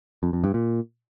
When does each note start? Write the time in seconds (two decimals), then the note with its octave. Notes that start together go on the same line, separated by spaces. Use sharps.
0.23 F2
0.33 F2
0.44 G2
0.54 A#2